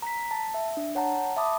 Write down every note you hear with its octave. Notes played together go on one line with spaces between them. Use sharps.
A#5 B6
A5
E5
D4
C#5 F#5 A5 A#5
E5 A5 B5 D6 D#6